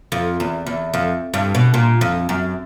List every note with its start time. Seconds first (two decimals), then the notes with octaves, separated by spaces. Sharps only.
0.12 F2
0.40 E2
0.66 E2
0.94 F2
1.34 G2
1.55 B2
1.74 A#2
2.01 F2
2.29 F#2